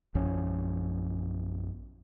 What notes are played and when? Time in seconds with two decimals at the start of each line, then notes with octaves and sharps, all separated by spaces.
0.15 A#1 F#2 F3 C#4